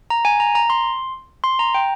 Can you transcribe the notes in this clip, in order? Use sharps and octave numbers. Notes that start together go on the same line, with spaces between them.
A#5
G#5
A#5
A#5
C6
C6
A#5
G5